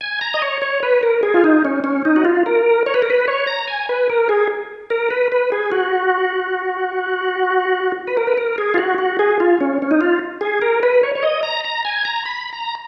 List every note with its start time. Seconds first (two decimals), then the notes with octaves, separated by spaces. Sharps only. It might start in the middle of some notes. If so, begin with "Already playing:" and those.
0.01 G#5
0.21 A#5
0.34 D#5
0.42 C#5
0.62 C#5
0.83 B4
1.03 A#4
1.23 G#4
1.34 F4
1.44 D#4
1.65 C#4
1.84 C#4
2.05 D#4
2.16 F#4
2.25 F4
2.46 A#4
2.86 C#5
2.94 B4
3.02 A#4
3.10 B4
3.28 C#5
3.47 A#5
3.68 G#5
3.89 B4
4.10 A#4
4.29 G#4
4.90 A#4
5.10 B4
5.32 B4
5.52 G#4
5.72 F#4
8.07 B4
8.17 A#4
8.27 B4
8.37 A#4
8.58 G#4
8.74 F4
8.78 F#4
8.98 F#4
9.19 G#4
9.40 F4
9.60 C#4
9.82 C#4
9.91 D#4
10.01 F4
10.41 G#4
10.62 A#4
10.83 B4
11.03 C#5
11.15 C#5
11.23 D#5
11.43 A#5
11.64 A#5
11.85 G#5
12.05 A#5
12.25 B5
12.53 A#5